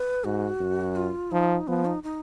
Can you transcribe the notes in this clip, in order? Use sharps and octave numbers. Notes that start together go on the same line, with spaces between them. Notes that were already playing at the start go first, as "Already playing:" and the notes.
Already playing: B4
G#2 F#4
F#2
F4
F3 D#4
F3 B3
D#4
D#4